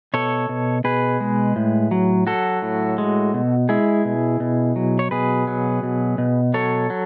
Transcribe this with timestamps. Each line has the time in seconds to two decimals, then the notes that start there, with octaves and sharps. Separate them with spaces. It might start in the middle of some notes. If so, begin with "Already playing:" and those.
0.14 B2 A4 C#5
0.49 B2
0.84 B2 G#4 B4
1.21 G#3
1.56 A2
1.91 F#3
2.27 F#3 F#4 A4
2.62 A2
2.98 G#3
3.34 B2
3.69 G#3 E4 G#4
4.05 B2
4.40 B2
4.76 F#3
4.99 C#5
5.11 B2 G#4 B4
5.47 F#3
5.83 B2
6.18 B2
6.54 F#3 A4 C#5
6.90 F#3